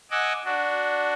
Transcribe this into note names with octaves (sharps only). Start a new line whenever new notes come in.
D#5 F#5 G#5 D6 E6
D4 F#4